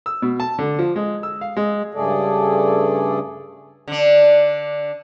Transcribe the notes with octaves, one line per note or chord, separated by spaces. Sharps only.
E6
B2
A5
D3
F3
G#3
E6
F5
G#3
G2 C#3 A3 G#4 A4 D5
D3 D4